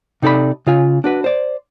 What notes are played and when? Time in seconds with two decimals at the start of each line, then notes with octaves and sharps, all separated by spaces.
0.22 C3 D#4 A4 D5 B5
0.67 C#3 F4 G#5
1.04 D4 F#4 B4
1.24 C5 D5